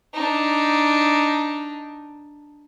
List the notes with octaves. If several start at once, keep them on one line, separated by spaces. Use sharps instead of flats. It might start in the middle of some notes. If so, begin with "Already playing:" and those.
D4 D#4